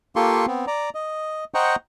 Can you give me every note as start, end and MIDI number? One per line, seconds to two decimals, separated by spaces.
0.16 0.46 58
0.16 0.46 65
0.16 0.46 67
0.16 0.46 69
0.16 0.46 84
0.16 0.46 85
0.47 0.65 59
0.47 0.65 60
0.67 0.90 74
0.67 0.90 82
0.95 1.44 75
1.54 1.76 72
1.54 1.76 75
1.54 1.76 78
1.54 1.76 79
1.54 1.76 82
1.54 1.76 85